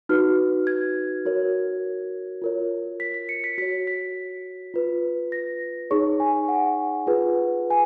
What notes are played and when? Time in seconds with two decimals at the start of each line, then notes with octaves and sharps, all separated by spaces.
0.09 D#4 F#4 B4 F6
0.67 G#6
1.25 F#4 A#4 C#5
2.42 F4 A#4 C#5
3.00 B6
3.14 B6
3.29 C#7
3.44 B6
3.58 F#4 C#5 B6
3.87 B6
4.74 F4 B4
5.32 A#6
5.91 D#4 G#4 C#5 C#6
6.20 G#5
6.48 F#5
7.07 F4 G#4 B4
7.71 G#5